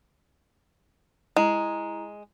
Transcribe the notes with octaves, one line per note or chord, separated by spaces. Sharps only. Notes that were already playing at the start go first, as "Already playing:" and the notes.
G#3 E4 A#5